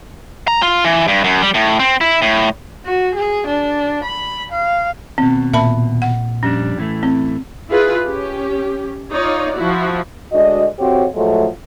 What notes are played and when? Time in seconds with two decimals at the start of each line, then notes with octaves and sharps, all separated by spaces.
0.48 A#5
0.62 F4
0.84 E3
1.08 G2
1.24 F#2
1.42 G3
1.54 A2
1.79 C4
2.01 E4
2.22 A2
2.86 F#4
3.15 G#4
3.47 D4
4.05 B5
4.52 F5
5.18 D#2 B2 C4
5.54 A#2 E5 A5 B5
6.02 F#5
6.43 F2 G3 C#4 D4
6.78 A2 E3 A3
7.03 C4
7.70 E4 F4 G#4 B4
8.05 C#4 G4
9.11 D#4 F4 C#5 D5
9.55 F3 E4 F#4
10.32 D2 G#3 D4 F#4 D#5
10.79 F2 C4 F#4 G4 C5 C#5
11.15 A2 F3 F#3 G#3 A3